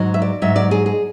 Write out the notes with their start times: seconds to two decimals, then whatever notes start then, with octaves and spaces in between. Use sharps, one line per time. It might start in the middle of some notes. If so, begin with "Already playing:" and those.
Already playing: G#2 F#3
0.14 E5
0.22 D5
0.42 G#2 F#3 E5
0.56 D5
0.71 G#4
0.86 G#4